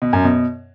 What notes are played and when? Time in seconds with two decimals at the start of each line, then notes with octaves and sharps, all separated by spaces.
0.02 B2
0.13 F#2
0.24 B2